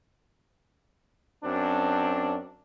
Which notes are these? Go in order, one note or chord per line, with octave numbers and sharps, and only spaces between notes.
F#2 C4 D4